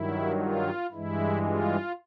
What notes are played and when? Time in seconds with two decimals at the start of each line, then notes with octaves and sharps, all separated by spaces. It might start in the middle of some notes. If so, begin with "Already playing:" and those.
Already playing: G2 D#3 F#3 E4
0.38 F4
0.91 G2 E3 G#3 E4
1.44 F4